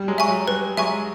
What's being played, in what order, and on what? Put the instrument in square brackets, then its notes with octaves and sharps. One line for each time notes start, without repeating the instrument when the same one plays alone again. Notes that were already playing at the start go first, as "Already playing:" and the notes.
Already playing: [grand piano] G3
F#3 G#3
[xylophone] E5 G#5 C#6
[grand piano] F#3
[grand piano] G3 [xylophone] B4
[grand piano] F#3 G#3 [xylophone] E5 G#5 C#6